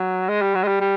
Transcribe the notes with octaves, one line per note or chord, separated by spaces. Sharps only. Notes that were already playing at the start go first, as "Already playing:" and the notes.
Already playing: F#3
G#3
G3
F#3
G#3
G3
G3